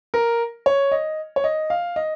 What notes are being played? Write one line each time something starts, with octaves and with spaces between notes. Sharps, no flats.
A#4
C#5
D#5
C#5
D#5
F5
D#5